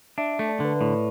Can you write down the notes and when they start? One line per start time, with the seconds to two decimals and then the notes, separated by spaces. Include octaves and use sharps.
0.18 D4 E5
0.33 E5
0.39 A3
0.49 D5
0.60 D3 B4
0.76 B4
0.81 A2 D5